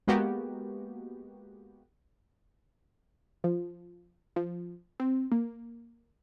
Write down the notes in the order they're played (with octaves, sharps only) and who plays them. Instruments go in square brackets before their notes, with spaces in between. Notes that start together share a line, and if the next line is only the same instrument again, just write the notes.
[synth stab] G#3 A#3 B3 F#4 G4
F3
F3
C4
A#3